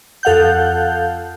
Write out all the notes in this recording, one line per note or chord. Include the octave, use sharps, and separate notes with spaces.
F2 A4 F5 F#5 F#6 G6